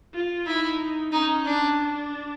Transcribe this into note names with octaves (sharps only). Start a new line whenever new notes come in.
F4
D#4 E4
C#4 D#4
D4
D4